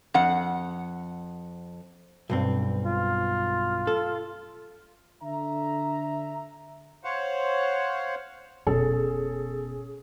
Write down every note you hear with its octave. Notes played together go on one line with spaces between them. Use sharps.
F2 F#5
B1 G2 C4
F4
A4
D3 E5 A#5
C5 C#5 F5 F#5
F1 B2 C#4 G#4 A4